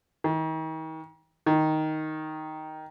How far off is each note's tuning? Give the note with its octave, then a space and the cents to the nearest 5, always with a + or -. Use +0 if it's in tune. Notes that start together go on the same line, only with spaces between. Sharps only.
D#3 +40
D#3 +5